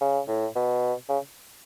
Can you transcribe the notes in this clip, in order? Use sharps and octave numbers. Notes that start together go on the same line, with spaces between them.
C#3
A2
B2
C#3